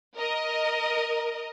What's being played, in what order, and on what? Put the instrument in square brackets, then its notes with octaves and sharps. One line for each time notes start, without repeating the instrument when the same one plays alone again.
[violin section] A#4 D#5